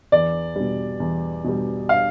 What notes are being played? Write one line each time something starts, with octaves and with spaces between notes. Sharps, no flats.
E2 D5
B2 G3
E2
B2 G3
F5